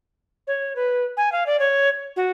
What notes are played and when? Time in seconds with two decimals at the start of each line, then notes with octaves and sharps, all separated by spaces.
0.47 C#5
0.75 B4
1.17 G#5
1.32 F5
1.46 D5
1.59 C#5
2.16 F#4